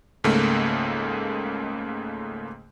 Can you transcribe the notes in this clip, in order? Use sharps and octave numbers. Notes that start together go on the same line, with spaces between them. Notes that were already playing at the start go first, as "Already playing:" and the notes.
C#2 G#2 C#3 A3 A#3